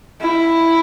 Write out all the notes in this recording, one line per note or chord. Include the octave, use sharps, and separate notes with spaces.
E4